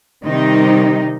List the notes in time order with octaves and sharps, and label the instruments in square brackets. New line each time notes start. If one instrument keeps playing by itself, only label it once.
[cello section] C3 D#3 G3 D#4